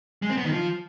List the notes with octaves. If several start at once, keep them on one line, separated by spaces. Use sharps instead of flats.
G#3
C4
B3
D#3
F3